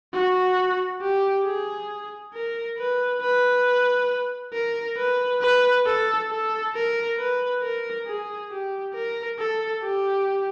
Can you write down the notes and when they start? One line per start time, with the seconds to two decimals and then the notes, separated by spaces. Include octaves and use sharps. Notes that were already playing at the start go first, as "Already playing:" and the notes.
0.14 F#4
1.02 G4
1.45 G#4
2.34 A#4
2.78 B4
3.21 B4
4.53 A#4
4.97 B4
5.41 B4
5.86 A4
6.30 A4
6.75 A#4
7.18 B4
7.62 A#4
8.07 G#4
8.51 G4
8.94 A#4
9.39 A4
9.83 G4